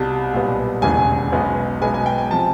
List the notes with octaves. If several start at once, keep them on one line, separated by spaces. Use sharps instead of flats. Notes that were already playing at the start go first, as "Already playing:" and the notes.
Already playing: C2 B2 G3 A5
B1 A#2 G3 B3
E1 D#2 C#3 E3 G#3 G#5
B1 B2 G#3 B3
B1 B2 G#3 B3 G#5
G#5
G5
G#5
C3 F3 A5